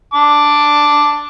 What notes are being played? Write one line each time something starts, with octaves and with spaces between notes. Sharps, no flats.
A5 D6